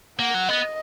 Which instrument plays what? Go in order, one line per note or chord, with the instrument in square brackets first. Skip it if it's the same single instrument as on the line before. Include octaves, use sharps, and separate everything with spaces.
[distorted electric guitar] A#3 [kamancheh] F#5
[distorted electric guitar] F#3
[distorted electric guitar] B3 [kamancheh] D#5